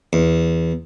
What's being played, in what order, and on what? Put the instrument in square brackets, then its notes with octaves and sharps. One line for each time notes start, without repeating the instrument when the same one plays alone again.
[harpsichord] E2